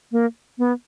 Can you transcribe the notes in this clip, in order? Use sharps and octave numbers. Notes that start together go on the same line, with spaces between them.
A#3
B3